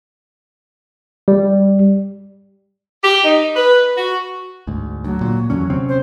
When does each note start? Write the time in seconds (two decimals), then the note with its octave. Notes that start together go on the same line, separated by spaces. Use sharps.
1.28 G3
3.04 G4
3.24 D#4
3.56 B4
3.96 F#4
4.67 D2 G#2
5.04 D2 F#3
5.21 A#2
5.50 E2 D3 F#3 C#4
5.70 C3 C4 C#4
5.89 C5